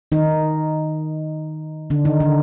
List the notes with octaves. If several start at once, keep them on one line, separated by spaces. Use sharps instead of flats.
D#3 D#4
D3 D4
D#3 D#4
D3 D4